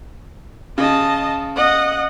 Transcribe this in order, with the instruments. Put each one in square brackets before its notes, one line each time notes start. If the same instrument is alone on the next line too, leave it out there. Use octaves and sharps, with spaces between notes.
[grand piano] C#3 [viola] D#5 A5
[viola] D#5 F#5